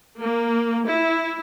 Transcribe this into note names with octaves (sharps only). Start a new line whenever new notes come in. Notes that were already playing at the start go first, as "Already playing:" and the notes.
A#3
E4